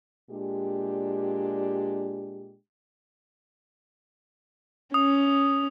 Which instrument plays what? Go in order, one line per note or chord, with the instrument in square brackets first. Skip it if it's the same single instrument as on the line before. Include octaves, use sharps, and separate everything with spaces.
[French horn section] A#2 G#3 D4 G4
[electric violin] C#4 [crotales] D#6